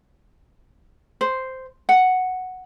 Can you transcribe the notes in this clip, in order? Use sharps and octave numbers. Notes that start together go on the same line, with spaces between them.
C5
F#5